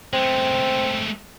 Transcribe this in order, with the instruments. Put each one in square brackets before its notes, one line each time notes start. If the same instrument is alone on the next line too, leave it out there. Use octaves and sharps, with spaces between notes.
[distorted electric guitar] G#3 A3 [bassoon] C4